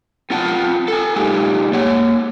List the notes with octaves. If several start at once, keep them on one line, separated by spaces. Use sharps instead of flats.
C4 F4 F#5 G#5 A5
A4 G#5
G#3 D#4 F4 G4 G#4
A#3 C#5 F#5